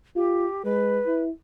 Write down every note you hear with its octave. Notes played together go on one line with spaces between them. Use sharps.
F4 G4
G#3 B4
E4